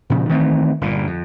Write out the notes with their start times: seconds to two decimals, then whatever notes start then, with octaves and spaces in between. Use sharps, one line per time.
0.10 A#2 C#3 F3
0.29 D#3 E3 A3 C4
0.81 G1 A#2
1.07 F2